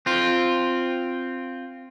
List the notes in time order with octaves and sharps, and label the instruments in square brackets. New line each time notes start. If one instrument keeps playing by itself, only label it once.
[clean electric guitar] C4 F4